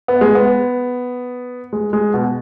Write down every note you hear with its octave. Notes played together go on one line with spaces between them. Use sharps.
B3
G#3
B3
G#3
G#3
B2